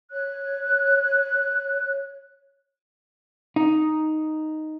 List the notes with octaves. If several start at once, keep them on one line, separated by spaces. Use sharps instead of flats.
C#5 F#6
D#4